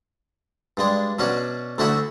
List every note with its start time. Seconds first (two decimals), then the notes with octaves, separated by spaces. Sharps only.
0.77 G2 G#3 D4
1.19 B2 C#4 D4 F#4
1.78 D2 A3 D4 E4 F#4 E5